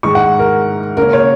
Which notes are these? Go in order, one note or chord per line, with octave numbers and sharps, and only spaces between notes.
G#2 D#3 G#3 D#4 C#6
F#5
A#4
C#3 A#3 C#4 A#4
C#5